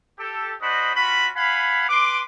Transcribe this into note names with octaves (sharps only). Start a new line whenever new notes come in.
G4 A4
D4 F#4 C5 D#5 B5
C#4 F4 F#4 B5
F5 F#5 G#5 B5
B4 C6 D6